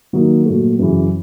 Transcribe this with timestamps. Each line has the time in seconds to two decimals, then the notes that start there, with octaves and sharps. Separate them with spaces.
0.13 D#3 F#3 A#3 D#4
0.45 A#2 F#3 A3
0.79 F#2 C#3 E3